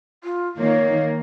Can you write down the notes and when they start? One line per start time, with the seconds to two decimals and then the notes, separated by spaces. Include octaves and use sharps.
0.24 F4
0.59 D#3 A#3 C#5